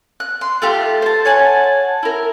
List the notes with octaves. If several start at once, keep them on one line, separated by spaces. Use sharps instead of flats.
F#6
C6
A3 F4 G4
C5 A5
C#5 F#5 G#5 A5
E4 A#4